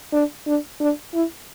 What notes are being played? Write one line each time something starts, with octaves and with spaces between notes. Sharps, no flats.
D4
D4
D4
E4